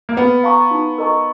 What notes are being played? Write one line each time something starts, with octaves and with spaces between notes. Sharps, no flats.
A#3
B3 B4
F5 A#5 C#6
D#4
A#4 D#5 A#5 C#6